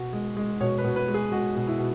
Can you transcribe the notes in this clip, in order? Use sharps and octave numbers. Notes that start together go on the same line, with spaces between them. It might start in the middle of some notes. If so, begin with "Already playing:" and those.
Already playing: B2 F#4
G#3
G#3
B2 C#5
B4
B2
B4
G#3
G#4
G#3 F#4
B2
E4
B2